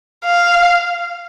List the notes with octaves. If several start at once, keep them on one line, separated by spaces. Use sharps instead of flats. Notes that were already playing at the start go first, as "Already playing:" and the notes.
F5